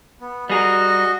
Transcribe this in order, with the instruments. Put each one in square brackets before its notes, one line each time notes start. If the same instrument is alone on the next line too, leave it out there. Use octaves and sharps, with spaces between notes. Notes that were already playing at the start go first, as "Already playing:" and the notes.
[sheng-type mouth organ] B3
[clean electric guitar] G3 G#4 A#4 [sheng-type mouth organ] F#4 D#5